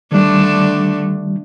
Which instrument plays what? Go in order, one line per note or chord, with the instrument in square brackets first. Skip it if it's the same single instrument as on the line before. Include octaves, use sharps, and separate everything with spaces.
[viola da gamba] D3 A3 D4 [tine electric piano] D#3 G3